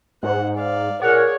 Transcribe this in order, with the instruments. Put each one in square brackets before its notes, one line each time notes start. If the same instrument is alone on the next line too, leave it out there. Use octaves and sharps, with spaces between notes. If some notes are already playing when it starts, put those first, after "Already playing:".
[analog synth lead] G#2 [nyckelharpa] C5 F#5
[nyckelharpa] D5 F5
[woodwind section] A#2 A#4 [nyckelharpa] G#4 D5 [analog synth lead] C#5 [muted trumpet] F#5